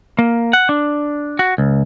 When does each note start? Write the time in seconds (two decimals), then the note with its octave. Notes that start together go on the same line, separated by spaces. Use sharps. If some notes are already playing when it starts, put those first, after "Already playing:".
0.19 A#3
0.53 F#5
0.69 D4
1.39 F#4
1.58 C#2